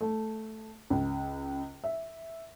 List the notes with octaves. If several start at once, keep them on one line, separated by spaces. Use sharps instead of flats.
A3
C#2
E5